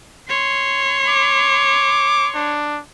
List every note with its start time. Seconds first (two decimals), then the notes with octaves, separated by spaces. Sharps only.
0.29 C#5 C6
1.09 D6
2.35 D4